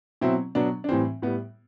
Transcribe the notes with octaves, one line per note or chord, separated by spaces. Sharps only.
B2 F#3 C4 E4
B2 F#3 B3 D4
D4
A2 E3 G3 C4
A2 G3 B3